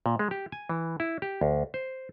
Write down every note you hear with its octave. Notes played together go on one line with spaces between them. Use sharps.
A#2
G#3
G4
G#5
E3
E4
G4
D2
C5